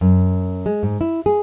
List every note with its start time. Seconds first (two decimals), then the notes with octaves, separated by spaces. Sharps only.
0.01 F#2
0.66 G#3
0.83 G#2
1.01 E4
1.26 G#4